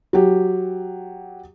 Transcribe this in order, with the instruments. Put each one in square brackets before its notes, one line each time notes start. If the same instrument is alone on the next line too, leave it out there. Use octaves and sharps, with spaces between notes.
[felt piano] F#3 G4